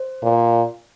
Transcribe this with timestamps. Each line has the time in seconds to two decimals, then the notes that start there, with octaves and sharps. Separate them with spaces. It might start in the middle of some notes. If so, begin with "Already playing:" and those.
Already playing: C5
0.23 A#2